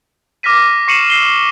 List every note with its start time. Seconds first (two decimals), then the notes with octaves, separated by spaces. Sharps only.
0.43 D6 F6 A#6 B6 D#7
0.88 C#6 C7 C#7 D#7 E7 F#7
1.10 E6 C7 G7